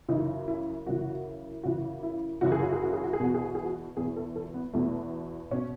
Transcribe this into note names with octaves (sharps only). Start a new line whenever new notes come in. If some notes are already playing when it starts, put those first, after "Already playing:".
F#2 C#3 E3 D#4
E4
F#2 C#3 E3 F#4
F#2 C#3 E3 F#4
E4
F#2 C#3 E3 F#4
G#4
F#4
G#4
F#4
G#4
F#4
G#4
E2 B2 F#4
G#4
F#4
G#4
F#4
E2 B2 G#4
A4
A4
B3
E2 B2 A3
B2 C#4